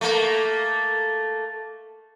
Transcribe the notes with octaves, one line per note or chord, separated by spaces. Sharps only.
A3 A#3